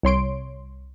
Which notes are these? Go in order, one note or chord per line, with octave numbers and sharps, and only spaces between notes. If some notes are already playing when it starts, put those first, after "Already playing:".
C2 C#5 C6 D7